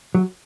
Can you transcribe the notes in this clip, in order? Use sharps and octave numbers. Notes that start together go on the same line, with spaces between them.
F#3